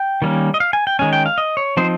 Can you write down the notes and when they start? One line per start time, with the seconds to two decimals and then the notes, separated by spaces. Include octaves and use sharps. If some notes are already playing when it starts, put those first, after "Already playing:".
Already playing: G5
0.22 D#3 G3 A#3 C#4
0.54 D#5
0.60 F5
0.73 G#5
0.87 G5
0.99 D#3 G#3 C#4 G#5
1.13 G5
1.26 F5
1.38 D#5
1.57 C#5
1.77 F3 C4 D#4 C5